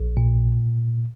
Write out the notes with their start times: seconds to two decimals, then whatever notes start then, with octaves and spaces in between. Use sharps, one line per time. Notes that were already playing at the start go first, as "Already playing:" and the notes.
Already playing: A#1
0.17 A#2